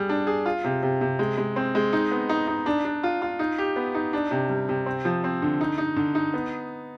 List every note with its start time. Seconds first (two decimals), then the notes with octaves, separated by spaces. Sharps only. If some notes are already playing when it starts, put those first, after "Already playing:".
Already playing: G3 G#4
0.09 D4
0.27 G#4
0.46 F4
0.64 C3
0.83 C3
1.01 C3
1.19 G#3
1.37 G#3
1.56 C4
1.75 G#3
1.93 D#4
2.12 B3
2.29 D#4
2.48 D#4
2.66 D4
2.85 D4
3.03 F4
3.22 F4
3.39 D#4
3.58 G4
3.76 B3
3.95 D#4
4.13 D4
4.31 C3
4.49 G3
4.69 C3
4.86 C4
5.05 F3
5.24 C4
5.42 D3
5.61 D#4
5.78 D#4
5.96 D3
6.15 D#4
6.34 B3